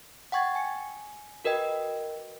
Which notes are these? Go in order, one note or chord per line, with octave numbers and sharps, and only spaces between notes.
F#5 G5 C#6 G#6 A6
G#5 C#7
F#4 A#4 B4 D#5 G5